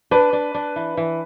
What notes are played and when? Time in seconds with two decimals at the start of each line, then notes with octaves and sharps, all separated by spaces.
0.11 D4 B4
0.33 D4
0.54 D4
0.76 E3
0.97 E3